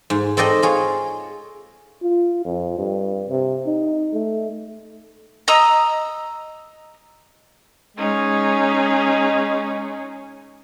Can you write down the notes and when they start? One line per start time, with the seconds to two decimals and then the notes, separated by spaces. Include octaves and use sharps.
0.10 G#2
0.37 C4 A4 D5 D#5 G5
0.62 F4 G#4 C#5
2.02 F4
2.45 F2
2.78 G2
3.29 C3
3.66 D#4
4.14 A3
5.48 D#5 A#5 D#6 E6
7.97 G#3 C#4 D#4 G#4